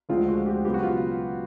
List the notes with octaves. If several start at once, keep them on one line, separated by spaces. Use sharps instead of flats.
D2 D3 F3 G#3 C4 F4
F#4
G4
C#3 F#3 B3 G4
F#4
F4